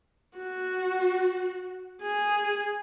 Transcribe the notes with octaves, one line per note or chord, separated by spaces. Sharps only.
F#4
G#4